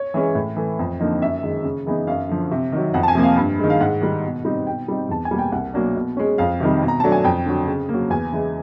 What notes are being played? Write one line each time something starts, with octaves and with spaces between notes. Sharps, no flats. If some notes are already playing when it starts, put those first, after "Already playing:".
Already playing: C#5
E3 G#3 C#4
A2
E3 A3
F2
D3 F3 A#3 D#4
F#2 E5
D#3 G#3
C#3
E3 G#3 B3 D#4
F#2 F5
D3 F3
C3
D#3 F#3
F2 F#5
A5
G#5
C3 F3 A#3
F5
G2
D#3 G#3
F5
G#2 F#5
D#3 G3
B2
G3 C4 D#4
B2 G5
G3 C4 D#4
E2 A5
G#5
B2 G3 A#3
G5
C2 F#5
B2 F#3 A#3 D4
B2
G#3 C#4
F2 F5
C3 D#3 G3
B2
A#5
F#3 A3 D4 A5
G#5
F2 G5
D3 F#3
C#3
A#3
F#3
E2 G#5
C#3 E3 G#3